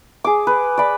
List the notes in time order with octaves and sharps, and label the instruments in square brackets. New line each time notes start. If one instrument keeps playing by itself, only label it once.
[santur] G#4 D6
B4
D5 B5